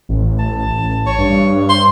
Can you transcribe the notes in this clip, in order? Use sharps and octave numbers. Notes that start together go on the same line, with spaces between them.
A1
A5
A1
C#5
G2
C6